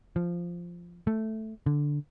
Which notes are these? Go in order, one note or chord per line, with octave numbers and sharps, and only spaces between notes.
F3
A3
D3